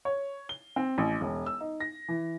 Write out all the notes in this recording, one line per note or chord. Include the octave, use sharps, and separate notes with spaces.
C#5
G7
C4
A1
E1
E6
D#4
A#6
E3